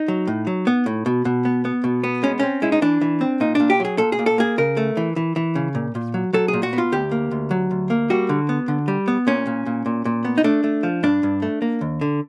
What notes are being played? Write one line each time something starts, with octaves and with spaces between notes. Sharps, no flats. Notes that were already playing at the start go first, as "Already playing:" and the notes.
Already playing: D#4
F#3
A2
F#3
B3
A2
B2
B2
B3
B3
B2
B3
G#3 C#4
C4 C#4
G#3 E4
D#4
E3 D4
E3
C4
A#2 D#4
A#2 D4
G4
F#3 G#4
A#2 A4
G#4
A#2
A4
A#3 G#4
C#3 A#4
A3
E3
E3
E3
C#3
A#2
A#2
F#3
F#3 A4
A#2 G#4
F#4
B3
F4
D2 G4
A#3
D2
F#3
D2
A#3
G3 F#4
D3
B3
D3
G3
B3
A#2 C#4
A#2
A#2
A#2
A#2
B3
D#4
A3 D4
A3
F3
G2 D4
G2
A3
A#3
D#2
D3